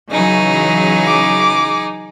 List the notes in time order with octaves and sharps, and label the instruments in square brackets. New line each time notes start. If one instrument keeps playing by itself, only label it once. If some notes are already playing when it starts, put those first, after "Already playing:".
[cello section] C#3 E3 F#3 [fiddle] D#4 G#4
[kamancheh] D6